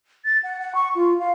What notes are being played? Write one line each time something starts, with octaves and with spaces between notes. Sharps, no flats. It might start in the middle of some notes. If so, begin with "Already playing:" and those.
A6
F#5
F#5
C#6
F4
F5